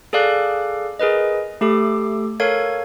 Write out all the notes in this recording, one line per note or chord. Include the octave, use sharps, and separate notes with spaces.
G#4 A4 D5 F5 D6 F#6
G#4 A#4 B4 D#5
A3 G4 A4 D6
A4 A#4 C#5 F5 G#6